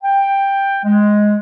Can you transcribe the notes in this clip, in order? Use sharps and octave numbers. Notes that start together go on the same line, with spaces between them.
G5
G#3